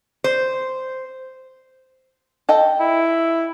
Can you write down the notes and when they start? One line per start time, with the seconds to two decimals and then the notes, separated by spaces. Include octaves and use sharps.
0.24 C5
2.49 A4 D#5 G5
2.80 E4